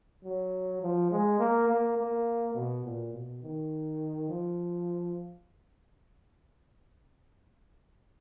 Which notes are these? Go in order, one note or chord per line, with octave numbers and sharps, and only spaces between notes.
F#3
F3
G#3
A#3
A#3
A#3
B2
A#2
B2
D#3
F3